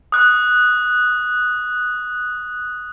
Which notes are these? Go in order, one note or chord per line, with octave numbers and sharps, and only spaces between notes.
D#6 F#6